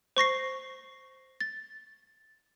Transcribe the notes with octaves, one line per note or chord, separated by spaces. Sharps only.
C5 C#6 A#6 C7
A6